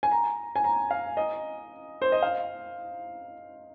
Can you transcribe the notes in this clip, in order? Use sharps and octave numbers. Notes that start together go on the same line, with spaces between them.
G#5
A#5
G#5
A#5
F5
D#5
C5
D#5
F5